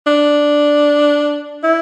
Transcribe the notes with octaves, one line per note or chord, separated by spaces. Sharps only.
D4
E4